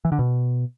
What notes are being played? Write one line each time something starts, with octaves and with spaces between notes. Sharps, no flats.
E3
D3
B2